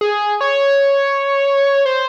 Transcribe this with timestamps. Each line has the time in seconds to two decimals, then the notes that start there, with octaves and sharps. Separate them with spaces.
0.01 G#4
0.41 C#5
1.86 C5